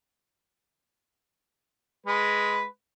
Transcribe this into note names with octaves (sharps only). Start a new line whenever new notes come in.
G#3 B4